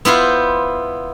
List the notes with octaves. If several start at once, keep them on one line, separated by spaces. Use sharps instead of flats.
B3 E4 F4 C5